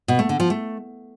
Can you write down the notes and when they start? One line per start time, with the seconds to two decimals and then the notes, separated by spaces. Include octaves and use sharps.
0.08 B2
0.19 A3
0.29 D3
0.40 F3
0.50 A3